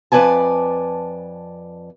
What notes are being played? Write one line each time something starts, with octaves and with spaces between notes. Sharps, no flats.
F2 B4 D5 G#5 A5